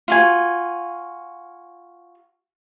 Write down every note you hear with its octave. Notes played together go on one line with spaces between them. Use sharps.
F4 F#4 G#5